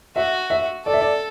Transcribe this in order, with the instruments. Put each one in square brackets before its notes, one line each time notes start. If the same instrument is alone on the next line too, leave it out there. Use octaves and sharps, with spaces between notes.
[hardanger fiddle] F#4 [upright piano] E5
[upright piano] E5
[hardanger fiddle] A4 [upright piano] D5
[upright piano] E5
D5